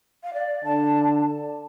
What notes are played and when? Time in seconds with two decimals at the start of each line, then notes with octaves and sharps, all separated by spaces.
0.23 F5
0.34 D5
0.64 D3 A5